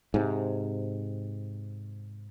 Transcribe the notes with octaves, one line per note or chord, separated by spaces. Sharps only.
G#2 C3